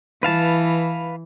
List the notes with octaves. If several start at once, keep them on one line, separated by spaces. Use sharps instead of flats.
E3 B4 F5 A5